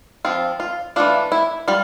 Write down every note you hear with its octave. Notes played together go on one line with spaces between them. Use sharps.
F3 C4 F4
F4
E3 A3 D4 F4
E4
G3 F4